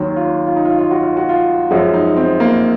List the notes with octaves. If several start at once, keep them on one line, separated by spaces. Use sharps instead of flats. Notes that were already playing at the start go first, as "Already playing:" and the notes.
Already playing: D#2 D#3 F#3
F4
F4
D#4
F4
F4
F#4
F4
F#4
F4
F#2 F3 G#3 F#4
D#4
C4
A#3